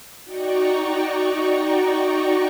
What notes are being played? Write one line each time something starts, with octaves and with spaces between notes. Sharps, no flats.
D#4 F#4 D5 G5 A#5 C#6